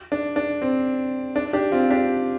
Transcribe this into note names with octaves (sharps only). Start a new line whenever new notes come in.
D4
D4
C4
D4
D4 G4
C4 F4
D4 G4